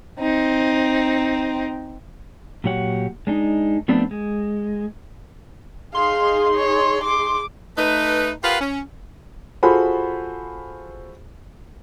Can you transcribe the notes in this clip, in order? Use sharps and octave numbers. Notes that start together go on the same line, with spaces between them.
C4 D#4
A#2 F#3 F#4 G4 C#5 F#5
G#3 D4 D#4
F3 A3 B3 C4 D4
G#3
D#4 G#4 F5 C6
C#5
D6
A3 D#4 B4
F4 G4 A#4 B4 F5 F#5
C#4
F4 F#4 G#4 A4 C5 B5